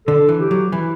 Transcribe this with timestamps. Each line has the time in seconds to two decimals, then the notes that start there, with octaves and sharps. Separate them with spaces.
0.07 D3 A4
0.29 E3
0.40 G4
0.51 F#3
0.71 E3 E4